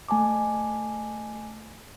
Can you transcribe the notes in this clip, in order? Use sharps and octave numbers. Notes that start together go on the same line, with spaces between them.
A3 G#5 A5 D6